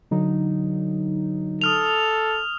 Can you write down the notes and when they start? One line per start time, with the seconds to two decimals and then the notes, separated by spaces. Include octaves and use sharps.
0.11 D3 F#3 D#4
1.61 A4 D#6 F6 F7